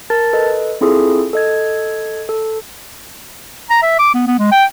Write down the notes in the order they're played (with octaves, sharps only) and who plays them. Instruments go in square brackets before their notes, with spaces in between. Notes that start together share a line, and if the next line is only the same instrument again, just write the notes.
[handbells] A#4 A5 A6
A4 B4 D#5
C4 E4 F4 G#4 A4
A4 D#5 G#6
A4
[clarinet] A#5
E5
D6
B3
B3
G#3
G5